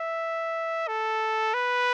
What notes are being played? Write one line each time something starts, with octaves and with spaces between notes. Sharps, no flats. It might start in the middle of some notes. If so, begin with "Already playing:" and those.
Already playing: E5
A4
B4